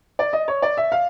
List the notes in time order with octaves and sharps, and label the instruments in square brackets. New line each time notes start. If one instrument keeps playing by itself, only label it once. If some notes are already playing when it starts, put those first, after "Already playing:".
[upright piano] D5
D#5
C#5
D5
E5
F5